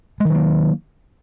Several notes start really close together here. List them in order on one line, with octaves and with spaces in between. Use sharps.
G#3 D#3 F#3 A#3